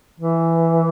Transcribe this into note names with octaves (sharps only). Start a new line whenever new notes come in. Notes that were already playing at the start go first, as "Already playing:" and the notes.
E3